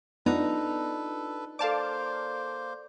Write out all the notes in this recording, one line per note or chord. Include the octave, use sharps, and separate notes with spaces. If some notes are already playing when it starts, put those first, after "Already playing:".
B3 D4 D#4 F4 A4 B4 D5
A#3 A4 C5 D5 F5 A5 D6